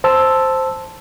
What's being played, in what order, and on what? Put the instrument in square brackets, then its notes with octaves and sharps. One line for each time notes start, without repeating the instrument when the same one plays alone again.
[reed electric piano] C5 A5 E6